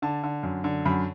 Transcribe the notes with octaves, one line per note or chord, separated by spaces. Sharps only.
D3 A5
D3
F#2
D3
F#2 B5